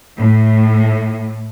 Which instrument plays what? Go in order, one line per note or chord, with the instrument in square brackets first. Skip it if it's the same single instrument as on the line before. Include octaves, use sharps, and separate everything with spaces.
[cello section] A2